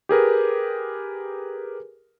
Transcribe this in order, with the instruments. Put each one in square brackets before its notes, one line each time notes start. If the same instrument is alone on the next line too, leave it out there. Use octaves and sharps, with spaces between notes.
[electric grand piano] G4 G#4 A#4 B4